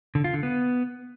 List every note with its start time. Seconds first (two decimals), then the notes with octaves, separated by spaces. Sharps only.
0.15 D3
0.24 F4
0.34 D3
0.43 B3